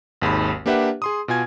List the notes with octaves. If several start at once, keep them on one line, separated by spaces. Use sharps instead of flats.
G#1 D#2 G#3 B5
A#3 D4 G4 B4 E5 F#5
G#4 C6 D#6
B2 F4 G#5 G#6